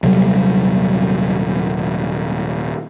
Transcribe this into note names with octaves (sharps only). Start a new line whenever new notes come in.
D#1 C3 F#3 G3